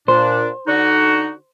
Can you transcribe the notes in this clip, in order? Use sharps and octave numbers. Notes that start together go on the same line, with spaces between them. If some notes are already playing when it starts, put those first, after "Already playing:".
A#2 D4 C5
D3 D#4 F#4